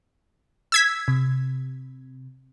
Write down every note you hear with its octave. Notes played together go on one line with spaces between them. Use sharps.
E6 G#6 B6
C3